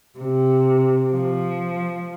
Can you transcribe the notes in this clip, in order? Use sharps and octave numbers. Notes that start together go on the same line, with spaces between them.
C3
F3